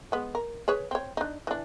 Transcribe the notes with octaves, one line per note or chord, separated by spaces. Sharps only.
G#3 B3
A#4
G#4 B4 C#5
C4 C#5
D4 D#4
E3 D4